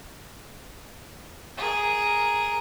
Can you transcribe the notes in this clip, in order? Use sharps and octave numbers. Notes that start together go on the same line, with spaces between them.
G#4 A#4